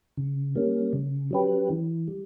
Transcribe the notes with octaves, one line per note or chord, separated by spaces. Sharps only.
C#3
G3 A#3 C#4
C#3
F#3 C#4 G4 B4
E3
G3